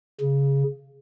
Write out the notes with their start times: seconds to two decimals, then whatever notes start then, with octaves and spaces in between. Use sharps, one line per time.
0.21 C#3